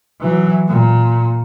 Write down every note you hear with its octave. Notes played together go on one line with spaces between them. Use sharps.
E3 F#3
A#2